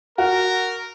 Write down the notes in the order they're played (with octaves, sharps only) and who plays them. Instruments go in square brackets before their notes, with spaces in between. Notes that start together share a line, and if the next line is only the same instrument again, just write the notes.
[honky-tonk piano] F#4 [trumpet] A#4